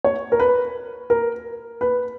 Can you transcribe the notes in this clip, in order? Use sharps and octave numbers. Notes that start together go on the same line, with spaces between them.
C#5
A#4
B4
A#4
B4